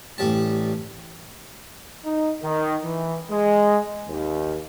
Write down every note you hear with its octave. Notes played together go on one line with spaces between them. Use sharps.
A1 G3 A5
D#4
D#3
E3
G#3
D#2